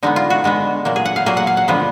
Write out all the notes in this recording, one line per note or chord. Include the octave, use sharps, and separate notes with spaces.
D3 G#3 B3 D#4
F4
F#4
D3 G#3 B3
A#2 F#3 A#3
G#4
F#5
F5
A#2 F#3 A#3 G#4
F#5
F5
F#5
D3 F3 G#3 B3